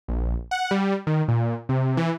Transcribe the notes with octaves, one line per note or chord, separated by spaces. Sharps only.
A#1
F#5
G3
D#3
A#2
C3
E3